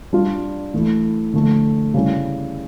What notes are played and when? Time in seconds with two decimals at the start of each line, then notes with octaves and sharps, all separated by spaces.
0.13 G3 D4 F4
0.74 E3 A3 E4
1.33 D3 F3 A3
1.94 C#3 G3 C#4 E4